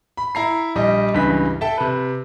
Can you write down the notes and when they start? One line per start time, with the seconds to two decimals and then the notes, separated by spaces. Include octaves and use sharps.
0.17 B5
0.35 E4 A#5 C7
0.75 A#1 G3 D#5
1.14 C#2 G2 E3 B4 B6
1.61 A4 E5 G5 A5
1.78 C3 B4